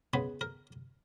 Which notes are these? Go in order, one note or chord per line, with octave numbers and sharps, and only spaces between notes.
C#3 G#3 B3 B4
A#4